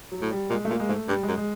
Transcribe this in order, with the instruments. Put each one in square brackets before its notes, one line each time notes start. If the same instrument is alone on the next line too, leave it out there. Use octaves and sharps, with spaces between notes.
[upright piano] F#3
[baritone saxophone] A2
[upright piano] G3
[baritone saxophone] A#2 [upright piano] G#3
[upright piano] A3
[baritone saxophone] A#2 [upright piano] A#3
[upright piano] G#3
[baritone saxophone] G#2 [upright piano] A3
[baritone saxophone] G2 [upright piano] G3
[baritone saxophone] F#2 [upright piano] G#3
[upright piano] G#3